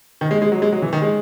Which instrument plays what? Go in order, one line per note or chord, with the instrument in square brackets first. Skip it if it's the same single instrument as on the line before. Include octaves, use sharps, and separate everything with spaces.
[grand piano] D#3
G#3
G#3
F#3
G#3
F#3
E3
D#3
G#3